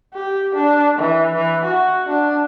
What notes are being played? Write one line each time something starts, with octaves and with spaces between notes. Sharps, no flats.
G4
D4
E3
E3
F#4
D4